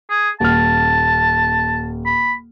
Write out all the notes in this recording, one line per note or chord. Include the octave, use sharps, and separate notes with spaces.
G#4
D#1 A5 F6
B5